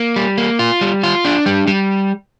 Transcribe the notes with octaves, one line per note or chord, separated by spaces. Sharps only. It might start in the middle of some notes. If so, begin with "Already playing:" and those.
Already playing: A#3
G3
A#3
F4
G3
F4
D4
G3
G3